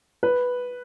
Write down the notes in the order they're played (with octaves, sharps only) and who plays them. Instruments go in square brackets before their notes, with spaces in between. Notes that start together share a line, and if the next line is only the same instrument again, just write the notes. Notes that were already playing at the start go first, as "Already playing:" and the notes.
[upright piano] B4